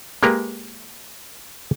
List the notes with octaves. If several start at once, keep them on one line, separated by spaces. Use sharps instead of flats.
G#3 A#3 G4 A#4 B4 F5